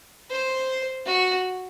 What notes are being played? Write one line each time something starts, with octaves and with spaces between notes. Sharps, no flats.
C5
F#4